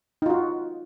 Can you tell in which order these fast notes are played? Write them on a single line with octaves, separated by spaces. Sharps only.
D#4 F4 F#4